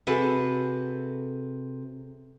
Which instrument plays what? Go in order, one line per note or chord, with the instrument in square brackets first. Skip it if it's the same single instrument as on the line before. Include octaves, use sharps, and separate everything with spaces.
[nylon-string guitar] C3 F#4 G#4 A4 B4